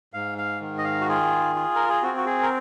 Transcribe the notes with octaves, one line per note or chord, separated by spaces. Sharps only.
G#2 F5
F5
D#3
D#5
F5
F#4
F4 G#4
F4
A#4
G#4
C4 F#4
F#4
G#4
A#4